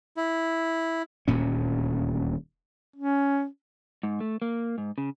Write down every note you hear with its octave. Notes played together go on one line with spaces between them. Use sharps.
E4
D#1 D2 A#2 C#4
C#4
G#2
A3
A#3
G#2
C#3